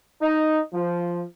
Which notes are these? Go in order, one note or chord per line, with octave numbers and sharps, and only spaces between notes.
D#4
F3